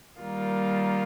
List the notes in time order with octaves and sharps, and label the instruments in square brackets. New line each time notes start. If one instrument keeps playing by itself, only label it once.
[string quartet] D#3 G3 A#3 F4